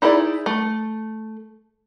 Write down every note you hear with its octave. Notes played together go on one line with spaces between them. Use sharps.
D#4 E4 G#4 C5 D5
A3